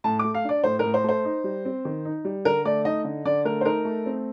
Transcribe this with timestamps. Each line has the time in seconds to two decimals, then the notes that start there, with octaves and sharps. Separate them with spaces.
0.04 A2 A5
0.19 A3 D6
0.34 F5
0.44 D4 D5
0.64 A2 C5
0.79 A2 A#4
0.94 C5
1.04 A3 C5
1.25 D#4
1.44 G3
1.65 C4
1.85 D#3
2.05 D#4
2.25 G3
2.45 D3 A#4
2.65 A3 D5
2.84 D#4 D#5
3.05 D3
3.25 D3 D5
3.45 A3 A#4
3.61 C5
3.65 D#4 A#4
3.85 A3
4.06 C4